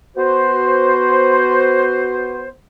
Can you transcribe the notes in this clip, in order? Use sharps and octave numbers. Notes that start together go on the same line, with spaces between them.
B3 F#4 C5